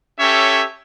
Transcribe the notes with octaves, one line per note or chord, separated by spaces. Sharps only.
C#4 G4 A4 C#5 E5